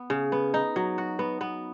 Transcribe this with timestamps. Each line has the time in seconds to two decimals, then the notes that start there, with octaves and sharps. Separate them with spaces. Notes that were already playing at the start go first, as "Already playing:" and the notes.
Already playing: B3
0.10 C#3
0.32 B3
0.54 D#4
0.76 F#3
0.98 F#4
1.19 B3
1.41 B3